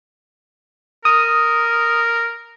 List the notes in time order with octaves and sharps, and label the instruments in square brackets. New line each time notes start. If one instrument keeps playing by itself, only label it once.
[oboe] A#4 [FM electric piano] D#6